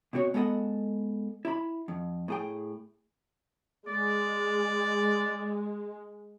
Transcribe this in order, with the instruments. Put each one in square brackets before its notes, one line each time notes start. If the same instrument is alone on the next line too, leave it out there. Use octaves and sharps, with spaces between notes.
[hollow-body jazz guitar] B2 C4 F#4 C#5
G#3 B3 A4 D#5 F#5
E4 B5
F2
A2 G#4 G5
[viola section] G#3 [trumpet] D5